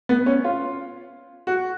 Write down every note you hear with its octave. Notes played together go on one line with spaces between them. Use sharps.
B3
C#4
F4
F#4